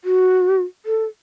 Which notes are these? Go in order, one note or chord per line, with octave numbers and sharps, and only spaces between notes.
F#4
A4